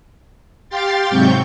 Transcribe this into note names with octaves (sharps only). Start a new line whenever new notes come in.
G4 F5 G5 C6 A6
G#2 C3 F#3 C4 C#6 G6